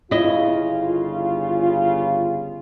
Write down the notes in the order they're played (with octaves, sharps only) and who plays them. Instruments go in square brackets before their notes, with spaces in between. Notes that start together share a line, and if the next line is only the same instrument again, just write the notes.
[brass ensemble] G1 C#3 F4 [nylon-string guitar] E4 D#5